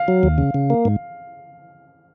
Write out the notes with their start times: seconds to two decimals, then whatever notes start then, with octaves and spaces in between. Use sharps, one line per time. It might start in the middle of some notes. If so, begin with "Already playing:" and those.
Already playing: F5
0.08 F#3
0.23 D#2
0.38 C#3
0.54 C#3
0.70 A#3
0.85 G#2